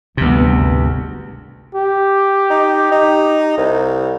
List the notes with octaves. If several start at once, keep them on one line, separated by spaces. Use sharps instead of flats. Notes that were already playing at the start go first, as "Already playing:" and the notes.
D2 C3 E3 G3 B3
G#1
G4
D#4
D#4
C2